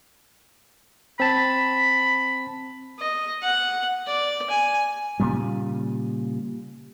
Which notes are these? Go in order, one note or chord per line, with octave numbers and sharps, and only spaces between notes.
C4 A5 B5
D#5
F#5
D5
G#5
A#2 C#3 G3